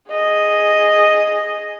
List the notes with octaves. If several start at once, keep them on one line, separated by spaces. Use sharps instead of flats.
G#4 D#5